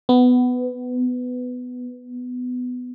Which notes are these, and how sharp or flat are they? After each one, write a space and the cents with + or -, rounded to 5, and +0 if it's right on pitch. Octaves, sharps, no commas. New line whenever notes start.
B3 +10